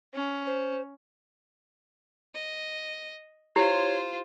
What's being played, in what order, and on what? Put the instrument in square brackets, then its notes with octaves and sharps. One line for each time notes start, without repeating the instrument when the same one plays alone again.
[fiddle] C#4
[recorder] C5
[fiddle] D#5
[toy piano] E4 G4 [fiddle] F4 C5 [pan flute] C#5